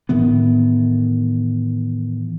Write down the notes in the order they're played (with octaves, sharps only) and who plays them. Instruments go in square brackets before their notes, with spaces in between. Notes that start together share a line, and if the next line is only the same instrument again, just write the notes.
[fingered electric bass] A2 D#3 E3 B3